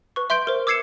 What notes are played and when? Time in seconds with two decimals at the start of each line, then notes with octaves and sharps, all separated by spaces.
0.16 B4 C#6
0.30 E5 C6 G6 D7
0.47 A#4 C5
0.67 D6 E6 G#6 C7 C#7 E7